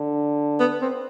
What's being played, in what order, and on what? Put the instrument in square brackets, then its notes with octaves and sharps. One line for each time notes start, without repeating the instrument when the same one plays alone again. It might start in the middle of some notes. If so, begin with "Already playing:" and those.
Already playing: [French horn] D3
[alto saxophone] B3
C4